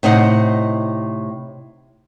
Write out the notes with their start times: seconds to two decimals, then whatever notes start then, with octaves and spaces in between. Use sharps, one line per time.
0.03 A2 C3 D#4 D#5 F#5